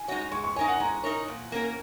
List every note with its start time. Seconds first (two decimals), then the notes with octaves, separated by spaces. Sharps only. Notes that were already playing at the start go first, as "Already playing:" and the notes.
Already playing: G#5
0.08 G#3 D#4 F#4 C#5
0.32 G#3 C#6
0.44 C#6
0.56 D#4 A#4 C#5 G#5
0.68 F#5
0.80 G#3 A#5
1.04 D#4 A#4 C#5
1.28 A#2
1.52 A#3 C#4 A#4